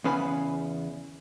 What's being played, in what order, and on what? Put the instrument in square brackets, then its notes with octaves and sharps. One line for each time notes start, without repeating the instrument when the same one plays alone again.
[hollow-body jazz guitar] E2 C#3 B4 G#5 B5